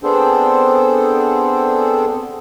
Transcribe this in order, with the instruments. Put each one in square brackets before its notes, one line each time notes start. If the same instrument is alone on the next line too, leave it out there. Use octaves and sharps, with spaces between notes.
[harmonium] B3 C4 D4 G#4 A4 C5